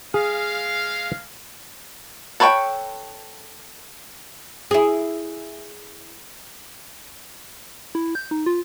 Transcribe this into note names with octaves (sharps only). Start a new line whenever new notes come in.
G#3 G#4 F5
A4 B4 C#5 F#5 G5
E4 G#4
E4
G6
D#4
F4